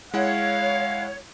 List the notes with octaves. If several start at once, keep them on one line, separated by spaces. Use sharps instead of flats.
G#3 E4 C#5 F5 F#5